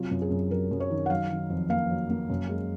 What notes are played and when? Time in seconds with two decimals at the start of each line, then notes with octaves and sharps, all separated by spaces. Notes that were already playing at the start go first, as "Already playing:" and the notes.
Already playing: C3 F#3 F4
0.11 F#2
0.22 G#4
0.31 F#2
0.50 F#3 A#4
0.71 F#2
0.80 C#5
0.90 D#3
1.06 F#5
1.10 F#3 F5
1.30 D#3
1.50 F2
1.70 A#3 F5
1.90 F#3
2.10 A#3
2.30 F#2
2.49 G#3